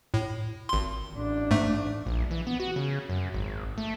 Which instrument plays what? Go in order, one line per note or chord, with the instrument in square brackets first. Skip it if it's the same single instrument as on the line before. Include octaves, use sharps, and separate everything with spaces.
[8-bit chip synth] A2
G#1 C6
[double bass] A1 D4
[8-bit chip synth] G#2 A3
[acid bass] A#1
E3
B3
F#4
C#3
F#2
G#1
A3